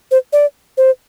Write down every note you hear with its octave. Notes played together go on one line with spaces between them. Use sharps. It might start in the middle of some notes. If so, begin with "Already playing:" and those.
C5
D5
C5